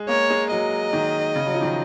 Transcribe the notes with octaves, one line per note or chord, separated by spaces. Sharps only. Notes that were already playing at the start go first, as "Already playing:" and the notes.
Already playing: G#3
A#3 C#5
G#3
F#3 D#5
D#3
C#3
F#3
F3
D#3